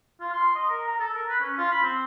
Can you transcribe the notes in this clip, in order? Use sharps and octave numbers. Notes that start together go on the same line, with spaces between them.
F4
C6
D#5
A#4
A#5
A4
A#4
B4
C#4
F4
B5
C4